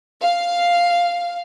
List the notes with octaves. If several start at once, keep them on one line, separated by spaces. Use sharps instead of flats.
F5